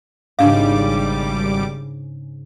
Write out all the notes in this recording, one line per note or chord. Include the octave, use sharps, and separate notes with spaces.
G#1 G#2 C#3 G3 D4 F5 D6